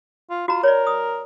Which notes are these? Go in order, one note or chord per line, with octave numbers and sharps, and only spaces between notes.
F4
F4 F#4 A#5
A#4 C#5 D5
D#6